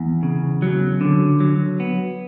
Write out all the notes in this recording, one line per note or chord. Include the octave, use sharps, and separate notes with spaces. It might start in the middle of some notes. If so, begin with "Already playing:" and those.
Already playing: E2
C#3
F#3
D3
F#3
B3